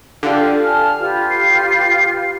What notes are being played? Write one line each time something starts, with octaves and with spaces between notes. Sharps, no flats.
D3 F4 G4 F5
G#5 A5 F6
F4 G4 B4
C7